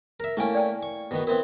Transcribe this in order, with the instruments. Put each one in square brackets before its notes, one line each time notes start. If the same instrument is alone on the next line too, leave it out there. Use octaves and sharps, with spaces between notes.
[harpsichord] A#4 E5
[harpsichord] A3 A#3 C#4 [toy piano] E4 G5 G#5
[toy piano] D5 G5 A#5
[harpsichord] C#6
B2 D#3 B3
[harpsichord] B3 C4 E4 [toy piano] A#4